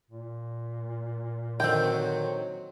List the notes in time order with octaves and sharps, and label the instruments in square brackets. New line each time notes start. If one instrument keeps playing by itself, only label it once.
[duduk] A#2
[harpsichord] D3 D#3 [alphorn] F#3 [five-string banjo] C4 G5